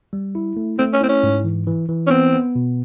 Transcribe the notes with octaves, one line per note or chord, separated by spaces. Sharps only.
G3
E4
A3
A3 C4
C#4
C4 E4
C#4
G#2
E3
E3
E3
C#4
B3 C4
B3
B2